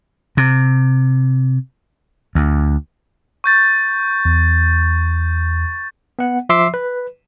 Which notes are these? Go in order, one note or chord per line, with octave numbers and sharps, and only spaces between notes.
C3
D2
C#6 G6 A6
E2
B3 F#5
F3 E5 C6 D6 E6 C7
B4